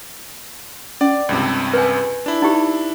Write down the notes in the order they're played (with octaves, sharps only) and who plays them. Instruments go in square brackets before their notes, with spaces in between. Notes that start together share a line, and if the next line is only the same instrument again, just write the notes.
[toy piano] C#4 [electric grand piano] D5
[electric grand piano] C#2 G2 C3
[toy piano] B4 G#5
[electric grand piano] D4 E4
[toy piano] D#4 G4